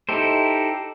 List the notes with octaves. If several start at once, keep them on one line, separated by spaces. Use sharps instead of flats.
D#4 E4 G4 A4 C5